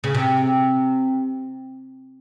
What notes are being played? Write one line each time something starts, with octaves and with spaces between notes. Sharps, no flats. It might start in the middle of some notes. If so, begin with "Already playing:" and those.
C#3
C3